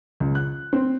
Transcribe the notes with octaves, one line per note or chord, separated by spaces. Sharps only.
C#2
F#6
C4